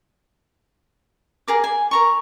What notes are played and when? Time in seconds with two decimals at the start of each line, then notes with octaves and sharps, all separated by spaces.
1.48 G#4 A#4 D6
1.64 G#5
1.91 A#4 A#5 C#6